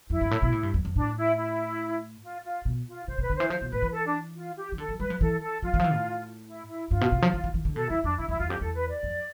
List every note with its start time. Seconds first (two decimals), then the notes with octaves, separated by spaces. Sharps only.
0.10 F2 E4
0.21 G2
0.31 A2
0.42 B2
0.52 A2
0.63 G2
0.74 F2
0.85 F2
0.96 A2 D4
1.17 E4
1.38 E4
2.23 F4
2.44 F4
2.65 B2
2.87 F4
3.08 C3 C5
3.18 C3
3.22 B4
3.30 D3
3.36 E3 C5
3.50 F3 C5
3.61 B2
3.72 A2 B4
3.82 E3
3.93 A4
4.07 D4
4.36 F4
4.57 G4
4.72 E3
4.78 D3 A4
4.89 F3
4.99 G3 B4
5.10 F3
5.21 E3 A4
5.42 A4
5.62 F3 F4
5.74 E3
5.80 F3
5.84 E3
5.94 A2
6.48 E4
6.69 E4
6.90 G2 F4
7.01 B2
7.12 C3
7.22 F3
7.34 E3
7.44 E3
7.54 E3
7.65 D3
7.76 B2 A4
7.89 E2 E4
8.04 F2 D4
8.18 D3 E4
8.28 F2 E4
8.40 E2 F4
8.50 F2 G4
8.60 E2 A4
8.75 B4
8.89 D5
9.03 F2